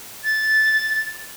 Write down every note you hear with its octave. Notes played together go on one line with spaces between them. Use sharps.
A6